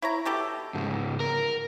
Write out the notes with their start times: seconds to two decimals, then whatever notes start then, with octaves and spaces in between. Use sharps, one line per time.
0.02 E4 C#5 A#5
0.25 B2 G4 A4
0.74 C#2 G#2
1.20 A#4